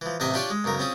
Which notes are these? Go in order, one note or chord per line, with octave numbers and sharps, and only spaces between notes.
E3 F3
A1 C3 C4 D#5 E5 G#5
D4 F4 G4 C#5 D5 G#5
G#3
B1 F#2 C#3 A#4
C4 C#4 F4 G#4